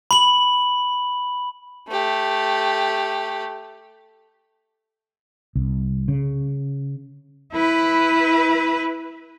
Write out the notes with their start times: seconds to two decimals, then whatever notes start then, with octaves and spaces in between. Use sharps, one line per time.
0.11 B5 F#7
1.89 A3 G4
5.55 C2
6.08 C#3
7.52 E4 B4